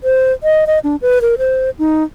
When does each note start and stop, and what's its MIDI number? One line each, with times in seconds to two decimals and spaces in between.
0.04 0.33 72
0.43 0.65 75
0.67 0.79 75
0.84 0.96 62
1.02 1.19 71
1.22 1.35 70
1.38 1.70 72
1.79 2.03 63